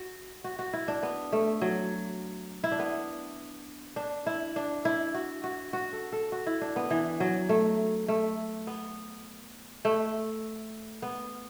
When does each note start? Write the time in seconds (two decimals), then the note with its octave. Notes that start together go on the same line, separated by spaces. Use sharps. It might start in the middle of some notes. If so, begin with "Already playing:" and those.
Already playing: F#4
0.44 F#4
0.59 F#4
0.73 E4
0.88 D4
1.03 B3
1.32 A3
1.62 F#3
2.64 E4
2.72 D4
2.79 B3
3.96 D4
4.26 E4
4.56 D4
4.85 E4
5.14 F#4
5.44 F#4
5.73 F#4
5.93 A4
6.12 A4
6.32 F#4
6.46 E4
6.61 D4
6.76 B3
6.91 E3
7.20 F#3
7.49 A3
8.08 A3
8.67 B3
9.85 A3
11.02 B3